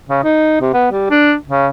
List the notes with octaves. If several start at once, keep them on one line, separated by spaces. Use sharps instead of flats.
C#3
D#4
C3
B3
G3
D4
C#3